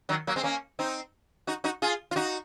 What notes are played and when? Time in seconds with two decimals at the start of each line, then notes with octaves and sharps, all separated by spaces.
0.09 D#3 F#3
0.27 F#3 A#3
0.36 G#3 C4
0.43 A#3 C#4
0.79 C4 D#4
1.47 D#4 F#4
1.64 D#4 F#4
1.82 F4 G#4
2.11 F4
2.16 D#4 F#4